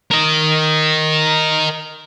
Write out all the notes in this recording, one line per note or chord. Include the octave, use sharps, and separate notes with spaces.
A#4 D#5